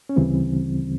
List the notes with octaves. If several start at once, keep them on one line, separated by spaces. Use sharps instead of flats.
C#4
D2 C#3 E3 G3 C4